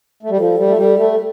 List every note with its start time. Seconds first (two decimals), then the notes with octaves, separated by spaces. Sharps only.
0.23 A3
0.30 G3
0.36 F3 A4
0.58 G3
0.68 A3
0.77 G3
0.97 A3